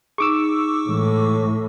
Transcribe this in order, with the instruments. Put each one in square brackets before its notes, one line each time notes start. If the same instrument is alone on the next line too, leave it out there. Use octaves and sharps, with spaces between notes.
[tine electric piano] D#4 G#4 [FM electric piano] C#6 D6 E6
[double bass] A2 [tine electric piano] E3 G#3